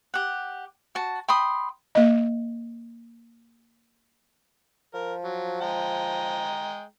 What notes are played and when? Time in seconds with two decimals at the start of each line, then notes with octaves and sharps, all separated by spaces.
0.14 G4 F#5
0.95 F#4 A5
1.28 G5 B5 C6 D#6
1.95 A#3 D#5
4.94 F3 A#4
5.24 F#3
5.61 G#3 G5 A#5